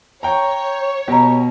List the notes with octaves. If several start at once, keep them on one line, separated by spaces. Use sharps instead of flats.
C#5 G5 A#5
B2 G4 D#5 A#5